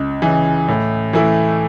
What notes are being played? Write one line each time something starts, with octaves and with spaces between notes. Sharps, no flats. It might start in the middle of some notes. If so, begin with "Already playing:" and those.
Already playing: C#2
C#3 E3
A2
E3 A3 E4